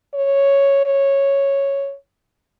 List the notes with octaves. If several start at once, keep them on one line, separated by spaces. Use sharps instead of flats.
C#5
C#5